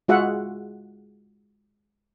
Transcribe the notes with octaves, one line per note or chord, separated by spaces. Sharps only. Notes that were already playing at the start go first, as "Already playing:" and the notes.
G#3 F4 F#4 G#4 E5 F#5